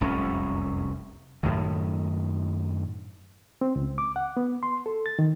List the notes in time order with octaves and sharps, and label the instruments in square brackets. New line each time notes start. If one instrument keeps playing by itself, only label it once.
[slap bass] F1 C2 F#2 C#4
F#2 A2 D#3
[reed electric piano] C4
C#2
D6
F#5
B3
C6
A4
A6
D#3